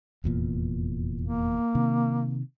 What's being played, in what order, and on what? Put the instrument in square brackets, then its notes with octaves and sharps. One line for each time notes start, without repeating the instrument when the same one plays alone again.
[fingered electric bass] F1 E2 A#2
[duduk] A#3
[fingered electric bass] C3 D#3